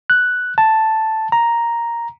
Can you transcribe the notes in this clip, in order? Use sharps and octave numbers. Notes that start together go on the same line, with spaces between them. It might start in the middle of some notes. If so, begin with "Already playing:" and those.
F#6
A5
A#5